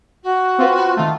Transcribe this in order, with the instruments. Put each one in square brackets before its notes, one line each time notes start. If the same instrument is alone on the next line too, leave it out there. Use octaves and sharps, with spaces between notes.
[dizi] F#4
[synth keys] C4 F4 B4
[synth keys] D#3 A3 [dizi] F4